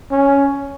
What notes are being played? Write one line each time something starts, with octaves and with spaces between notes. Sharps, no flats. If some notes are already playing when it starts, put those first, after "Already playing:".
C#4